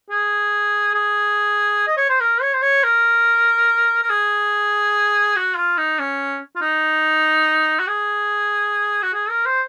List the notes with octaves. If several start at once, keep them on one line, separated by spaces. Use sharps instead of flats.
G#4
G#4
D#5
C#5
C5
A#4
C#5
C5
C#5
A#4
A#4
G#4
F#4
F4
D#4
C#4
F4
D#4
F#4
G#4
F#4
G#4
A#4
C5